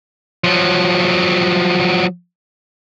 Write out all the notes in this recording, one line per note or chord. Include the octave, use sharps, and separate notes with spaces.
F3 F#3